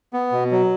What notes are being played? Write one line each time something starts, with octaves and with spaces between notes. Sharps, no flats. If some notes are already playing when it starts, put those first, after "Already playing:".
B3
B2
F#3